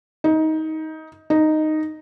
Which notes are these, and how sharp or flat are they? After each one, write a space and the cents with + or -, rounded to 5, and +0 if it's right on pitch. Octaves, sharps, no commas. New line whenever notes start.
D#4 +20
D#4 -5